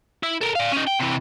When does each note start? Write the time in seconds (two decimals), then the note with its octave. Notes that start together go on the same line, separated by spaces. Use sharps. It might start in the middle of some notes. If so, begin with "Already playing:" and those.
0.23 E4
0.41 A4 A#4
0.55 D5 F5
0.72 C#4 D#4
0.87 G5
0.99 C3 E3